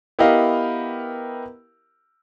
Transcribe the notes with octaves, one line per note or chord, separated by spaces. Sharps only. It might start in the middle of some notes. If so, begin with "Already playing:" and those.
B3 E4 G4 A#4 D#5 F5